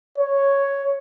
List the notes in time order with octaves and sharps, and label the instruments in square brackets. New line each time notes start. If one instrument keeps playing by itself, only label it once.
[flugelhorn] C#5